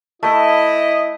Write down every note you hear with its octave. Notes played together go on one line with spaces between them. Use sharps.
A3 E4 D#5 E5